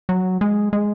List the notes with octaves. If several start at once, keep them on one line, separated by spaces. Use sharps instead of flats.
F#3
G#3
G#3